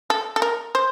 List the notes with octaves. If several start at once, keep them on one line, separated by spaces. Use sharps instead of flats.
A4
A4
A#4
C5